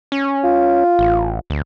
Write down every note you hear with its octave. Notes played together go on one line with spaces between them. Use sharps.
C#4
F4
A1
D2